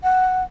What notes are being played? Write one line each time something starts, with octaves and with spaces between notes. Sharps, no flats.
F#5